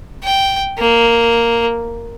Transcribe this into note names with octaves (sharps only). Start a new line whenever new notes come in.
G5
A#3